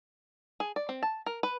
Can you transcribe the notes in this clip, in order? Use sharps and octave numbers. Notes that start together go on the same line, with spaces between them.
G#4
D5
C4
A5
A#4
B4